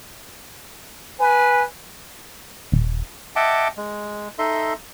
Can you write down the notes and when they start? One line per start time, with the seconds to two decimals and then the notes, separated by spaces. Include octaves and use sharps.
1.20 B4 G#5
2.72 D#1
3.36 D#5 E5 F#5 G5 A5 D6
3.77 G#3
4.39 D#4 A4 D#5 E5 C6